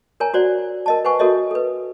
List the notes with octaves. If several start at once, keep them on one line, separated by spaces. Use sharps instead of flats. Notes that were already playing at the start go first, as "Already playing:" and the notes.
A#4 C#5 G#5 A#5
F#4 C5 D5 F#5
A#4 D#5 A5
B4 C5 F#5 G#5 C#6
F#4 A4 A#4 C#5 D#5 E5
A4 B4